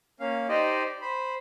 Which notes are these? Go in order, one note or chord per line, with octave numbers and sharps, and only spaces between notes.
A#3 C#4 F5
D#4 G4 C5 D5 D#5
C5 B5